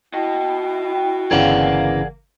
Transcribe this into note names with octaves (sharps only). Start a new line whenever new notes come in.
E4 F#4 D#5 G5
G1 C#3 E3 G#4 A#4 D5 F5 F#5